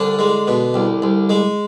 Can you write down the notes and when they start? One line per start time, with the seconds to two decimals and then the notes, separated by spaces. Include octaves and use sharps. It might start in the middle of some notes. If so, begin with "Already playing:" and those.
Already playing: C2 D3 D4
0.19 G#3
0.47 B2
0.74 C2
1.02 C2
1.29 G#3